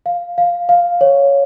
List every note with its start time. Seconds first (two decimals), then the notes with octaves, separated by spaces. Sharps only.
0.06 F5
0.38 F5
0.69 F5
1.01 C#5